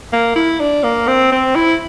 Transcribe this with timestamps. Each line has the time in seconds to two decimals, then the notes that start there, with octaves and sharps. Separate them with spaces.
0.13 A#3
0.36 E4
0.60 D4
0.84 A#3
1.07 C4
1.32 C4
1.55 E4